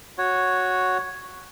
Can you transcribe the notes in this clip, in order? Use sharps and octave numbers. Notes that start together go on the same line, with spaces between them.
F#4 C#5